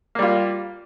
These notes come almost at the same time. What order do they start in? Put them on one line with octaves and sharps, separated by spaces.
A#3 G3 F4